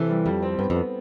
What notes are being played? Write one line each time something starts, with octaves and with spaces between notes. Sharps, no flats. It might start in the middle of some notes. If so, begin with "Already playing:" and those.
Already playing: C3 E3 A4
G3
F2 G3
C4
G2 B3
F2
B3